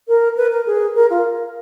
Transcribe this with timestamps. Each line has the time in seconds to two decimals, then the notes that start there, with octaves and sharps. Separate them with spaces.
0.08 A#4
0.37 B4
0.52 A#4
0.66 G#4
0.95 A#4
1.10 F4